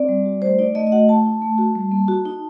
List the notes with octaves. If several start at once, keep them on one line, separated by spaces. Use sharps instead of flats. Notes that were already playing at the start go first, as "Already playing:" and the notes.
Already playing: C4 D5
G3
F#4
A3 C5
D#4 D5
A3 D#5
D#5
F#4 F#5
A3 A5
D#4
A3
F#4
G3
A#3
F#4
D#4